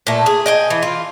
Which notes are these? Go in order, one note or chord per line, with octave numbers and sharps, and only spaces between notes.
A#2 A3
G#4
D#5 G5 G#5
E3
F4